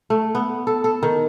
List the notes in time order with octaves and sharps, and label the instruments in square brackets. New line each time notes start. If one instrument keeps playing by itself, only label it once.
[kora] A3
B3
A4
A4
D#3